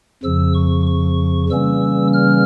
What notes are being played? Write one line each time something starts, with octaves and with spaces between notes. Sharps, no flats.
F2 C#3 F3 E6
C#6
C#6
C#3 E3 G3 A#3 C#4 E6
F6